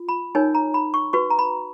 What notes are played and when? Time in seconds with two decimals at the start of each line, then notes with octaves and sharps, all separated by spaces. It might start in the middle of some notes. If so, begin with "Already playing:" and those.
Already playing: F4
0.09 B5
0.35 D#4 A#4 C#5 G#5
0.55 A#5
0.74 B5
0.94 C#6
1.13 F#4 B4 C#6
1.30 A#5
1.39 B5